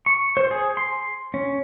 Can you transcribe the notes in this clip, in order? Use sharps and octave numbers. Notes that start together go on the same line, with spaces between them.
C#6
C5
G#4
C6
C#4